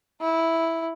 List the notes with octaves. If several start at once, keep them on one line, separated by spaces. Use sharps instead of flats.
E4